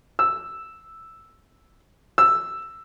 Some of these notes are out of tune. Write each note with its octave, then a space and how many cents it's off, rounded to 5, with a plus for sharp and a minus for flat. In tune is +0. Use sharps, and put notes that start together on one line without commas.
E6 +0
E6 +5